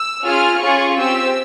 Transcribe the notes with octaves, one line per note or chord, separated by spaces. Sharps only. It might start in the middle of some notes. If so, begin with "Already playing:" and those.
Already playing: E6
C#4 F4 G#4 F6
C#4 F4 G#4 C#6
C4 G4 E6